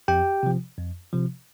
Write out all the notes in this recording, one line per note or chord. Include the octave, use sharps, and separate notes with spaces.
F2 G4 G5
C3 F3
F2
C3 F3